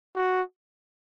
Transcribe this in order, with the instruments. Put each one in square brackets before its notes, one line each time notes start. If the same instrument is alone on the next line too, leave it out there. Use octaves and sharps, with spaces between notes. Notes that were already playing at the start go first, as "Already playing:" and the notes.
[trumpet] F#4